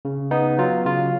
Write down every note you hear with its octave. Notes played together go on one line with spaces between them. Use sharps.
C#3
B3 D#4
F#3 F4
C#3 F4